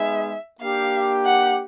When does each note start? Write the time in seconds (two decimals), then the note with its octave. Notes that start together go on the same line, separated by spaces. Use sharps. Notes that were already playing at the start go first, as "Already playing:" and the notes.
Already playing: G#3 B3 D#4 G#4 E5
0.61 A#3 D4 G4 F5
1.26 F#5